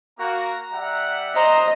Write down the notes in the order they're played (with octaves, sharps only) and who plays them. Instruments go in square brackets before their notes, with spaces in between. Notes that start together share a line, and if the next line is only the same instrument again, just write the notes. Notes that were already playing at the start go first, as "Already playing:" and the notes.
[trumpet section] A#3 F#4 [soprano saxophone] A#5
[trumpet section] G3 E5 F#5
[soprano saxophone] C5 [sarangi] D#5 [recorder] A#5